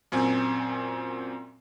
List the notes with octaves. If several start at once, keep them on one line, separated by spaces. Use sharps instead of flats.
F#2 A#2 C4 G#5 G#6